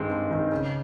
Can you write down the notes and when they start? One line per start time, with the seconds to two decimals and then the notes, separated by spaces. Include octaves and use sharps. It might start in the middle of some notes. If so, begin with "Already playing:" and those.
Already playing: G2 D#3 G#3 C4
0.11 G2
0.31 D#3 G#3 C4
0.52 C#3